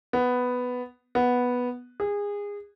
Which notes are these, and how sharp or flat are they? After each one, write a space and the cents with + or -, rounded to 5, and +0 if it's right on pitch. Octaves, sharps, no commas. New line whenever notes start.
B3 +5
B3 -5
G#4 -25